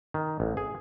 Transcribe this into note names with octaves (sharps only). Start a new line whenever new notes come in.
D#3
A1
G#4